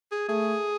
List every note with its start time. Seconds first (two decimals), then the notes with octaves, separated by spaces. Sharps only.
0.11 G#4
0.28 A3 G#4